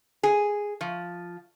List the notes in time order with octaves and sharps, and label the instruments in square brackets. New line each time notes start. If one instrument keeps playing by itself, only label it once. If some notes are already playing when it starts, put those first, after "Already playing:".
[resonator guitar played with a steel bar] G#4
F3